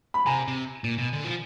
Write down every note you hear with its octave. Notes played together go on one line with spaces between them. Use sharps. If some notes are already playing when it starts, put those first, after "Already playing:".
B5
C3 G#5 A#5
C3
A#2
B2
D3
F3